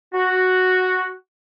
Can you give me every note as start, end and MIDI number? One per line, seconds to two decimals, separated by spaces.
0.14 1.12 66